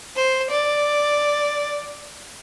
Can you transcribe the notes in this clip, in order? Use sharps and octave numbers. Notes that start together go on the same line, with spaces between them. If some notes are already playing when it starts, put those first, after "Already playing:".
C5
D5